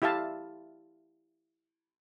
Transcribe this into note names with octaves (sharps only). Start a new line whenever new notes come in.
E4 G4 E5 F5 A5